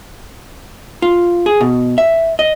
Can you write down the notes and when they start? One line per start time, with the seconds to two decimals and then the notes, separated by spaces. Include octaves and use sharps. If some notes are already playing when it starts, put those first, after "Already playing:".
1.02 F4
1.46 G#4
1.61 B2
1.98 E5
2.39 D#5